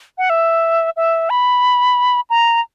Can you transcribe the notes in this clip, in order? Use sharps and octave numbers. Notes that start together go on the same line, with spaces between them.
F#5
E5
E5
B5
A#5